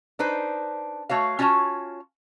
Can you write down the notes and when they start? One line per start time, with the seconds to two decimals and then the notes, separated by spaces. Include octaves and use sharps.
0.19 D4 D#4 B4 C5
1.09 A3 F#4 C#5 F5
1.39 C#4 F4 F#4 C#5 A5